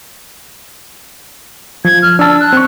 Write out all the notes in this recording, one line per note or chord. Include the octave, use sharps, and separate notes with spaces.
F3 G#6
F6
D4 A5 E6
F#6
C4 C#6